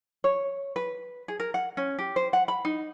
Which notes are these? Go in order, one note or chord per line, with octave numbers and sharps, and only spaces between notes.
C#5
B4
G#4
A#4
F#5
C#4
G4
C5
F#5
B5
D#4